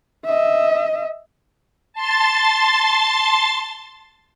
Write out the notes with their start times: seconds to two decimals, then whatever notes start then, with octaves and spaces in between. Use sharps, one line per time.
0.25 D#5 E5
1.93 A5 C6 A6